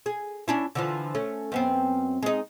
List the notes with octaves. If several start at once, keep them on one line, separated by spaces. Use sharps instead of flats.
G#4
C#4 D4 E4
D3 E3 F3
A3 C#4
F#2 B3 C4
G#3 D#4